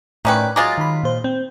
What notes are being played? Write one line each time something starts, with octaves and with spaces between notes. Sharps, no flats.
A2 D#3 C#4 B4 D5 G5
F#3 G#3 F4 D6 A6 A#6
D#3 B5
A#2 C5
C4